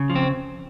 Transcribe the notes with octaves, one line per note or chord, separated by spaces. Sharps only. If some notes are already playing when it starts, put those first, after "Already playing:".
Already playing: C#3
F3
C4